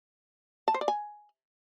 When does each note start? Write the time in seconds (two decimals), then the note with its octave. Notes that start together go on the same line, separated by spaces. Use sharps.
0.68 A5
0.74 C5
0.81 D5
0.88 G#5